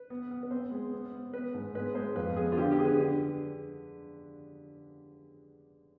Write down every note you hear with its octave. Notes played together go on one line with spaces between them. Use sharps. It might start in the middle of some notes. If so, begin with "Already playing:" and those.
Already playing: B4
B3
B3
B4
C4 C5
G#3
B3
B3
B3 B4
G#2
G#3 B4
G#3 C5
F2 B4
B3 G#4
F4
D3 G4
G4
D3 G#4
B4
D3